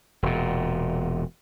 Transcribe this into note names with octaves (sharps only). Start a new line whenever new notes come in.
E1 A#2